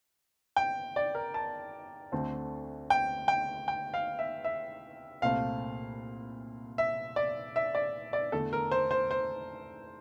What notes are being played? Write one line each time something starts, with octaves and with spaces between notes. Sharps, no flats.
G5
D5
A#4
A5
D2 D3 A3 C4
G5
G5
G5
F5
E5
E5
C2 A#2 A3 C4 F5
E5
D5
E5
D5
D5
E2 D3 A3 A4
A#4
C5
C5
C5